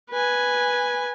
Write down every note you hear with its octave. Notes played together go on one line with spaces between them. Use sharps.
B4 G#5